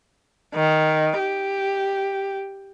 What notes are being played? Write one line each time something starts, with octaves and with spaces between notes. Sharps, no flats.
D#3
G4